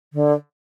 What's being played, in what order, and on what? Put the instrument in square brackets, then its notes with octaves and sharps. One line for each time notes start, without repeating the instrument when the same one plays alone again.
[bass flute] D3